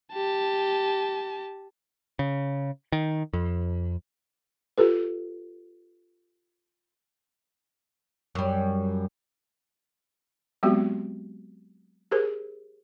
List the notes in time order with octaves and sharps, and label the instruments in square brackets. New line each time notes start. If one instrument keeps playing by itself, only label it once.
[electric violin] G4 A5
[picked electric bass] C#3
D#3
F2
[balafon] F4 G4 A4 B4
[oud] F#2 G3
[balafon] F#3 G#3 B3 C4 F#4 G4
G4 G#4 A#4 C5